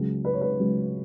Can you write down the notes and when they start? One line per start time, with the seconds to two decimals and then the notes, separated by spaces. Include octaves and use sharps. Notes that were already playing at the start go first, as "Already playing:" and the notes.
Already playing: C#2 C#3 F#3
0.25 B4
0.34 C#5
0.41 B4
0.60 C#2 C#3 F#3